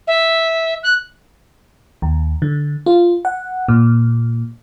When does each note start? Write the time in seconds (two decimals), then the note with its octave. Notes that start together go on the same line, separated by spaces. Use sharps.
0.07 E5
0.83 F#6
2.02 D#2
2.42 D3
2.86 F4
3.25 F#5
3.68 A#2